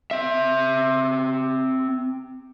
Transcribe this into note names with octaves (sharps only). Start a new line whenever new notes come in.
C4 E5